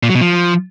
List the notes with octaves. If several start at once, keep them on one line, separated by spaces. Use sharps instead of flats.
A#2
F#3
B2
F3